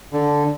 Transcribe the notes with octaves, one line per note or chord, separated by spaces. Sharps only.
D3